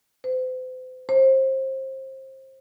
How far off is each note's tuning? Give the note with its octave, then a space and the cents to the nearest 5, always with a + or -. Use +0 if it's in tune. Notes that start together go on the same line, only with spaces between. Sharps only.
C5 -40
C5 +25